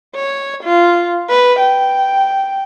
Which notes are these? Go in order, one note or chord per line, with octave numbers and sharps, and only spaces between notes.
C#5
F4
B4
G5